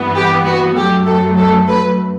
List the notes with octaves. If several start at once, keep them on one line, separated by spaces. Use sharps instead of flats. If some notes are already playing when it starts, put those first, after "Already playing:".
Already playing: G2 E3 B3
G4
F#4
F#2 F#3 A3 G4
A4
A4
B4